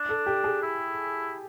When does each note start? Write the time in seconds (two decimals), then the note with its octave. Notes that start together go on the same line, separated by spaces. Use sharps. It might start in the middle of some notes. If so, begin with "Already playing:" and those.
Already playing: D4
0.09 A4
0.26 G4
0.44 G#4
0.63 E4